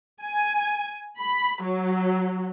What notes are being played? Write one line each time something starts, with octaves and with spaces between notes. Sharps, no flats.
G#5
B5
F#3